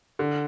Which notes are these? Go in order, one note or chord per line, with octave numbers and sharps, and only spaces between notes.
D3